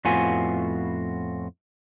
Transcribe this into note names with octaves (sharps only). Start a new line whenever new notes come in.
F2 A2 B3 F4 F#4 G#5